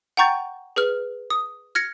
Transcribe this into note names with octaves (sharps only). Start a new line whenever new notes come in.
F#5 G5 A#5 C#6 G6 A6
G#4 B4 F6
D#6
F6 G#6 A#6 C#7